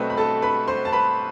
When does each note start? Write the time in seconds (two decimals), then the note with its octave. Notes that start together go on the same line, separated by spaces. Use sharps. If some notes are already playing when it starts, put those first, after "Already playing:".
Already playing: B2 F#3 A3 C4 B4 C5
0.10 B5
0.17 A4 A5
0.42 B4 B5
0.68 C5 C6
0.85 A5
0.93 B4 B5